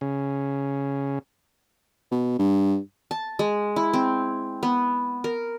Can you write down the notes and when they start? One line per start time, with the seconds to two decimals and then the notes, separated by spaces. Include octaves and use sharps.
0.01 C#3
2.12 B2
2.39 G2
3.11 A5
3.39 G#3
3.76 E4
3.93 C4
4.63 B3
5.24 A#4